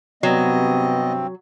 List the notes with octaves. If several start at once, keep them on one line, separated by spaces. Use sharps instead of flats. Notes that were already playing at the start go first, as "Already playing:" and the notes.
G2 C3 F#3 B3 C4 D#5